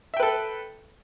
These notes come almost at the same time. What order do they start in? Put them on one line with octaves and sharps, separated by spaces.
E5 G5 B4 A4